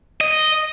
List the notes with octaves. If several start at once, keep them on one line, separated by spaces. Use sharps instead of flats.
D#5